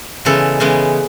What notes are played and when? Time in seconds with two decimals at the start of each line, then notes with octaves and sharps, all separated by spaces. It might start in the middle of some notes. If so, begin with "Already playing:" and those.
0.25 C#3 E3 G#3 B3 A4
0.60 C#3 E3 G#3 B3